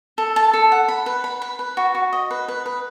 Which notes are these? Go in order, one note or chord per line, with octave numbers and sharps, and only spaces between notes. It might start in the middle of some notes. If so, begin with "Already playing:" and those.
A4
A5
A4
F#5
B5
B4
B5
B4
B4
F#4
F#4
D#5
B4
B4
B4